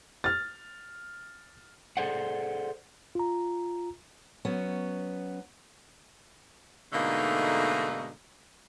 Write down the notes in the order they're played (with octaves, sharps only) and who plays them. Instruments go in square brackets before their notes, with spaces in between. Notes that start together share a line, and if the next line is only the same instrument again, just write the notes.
[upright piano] F6 A6
[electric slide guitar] G#4 A4 C5 D5 F#5
[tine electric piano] F4 A#5
[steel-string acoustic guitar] F#3 B3 C#4
[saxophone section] G#2 B2 D3 A3 A#3 D#4